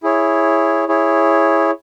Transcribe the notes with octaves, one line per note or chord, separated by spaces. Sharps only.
E4 G#4 C#5
E4 G#4 C#5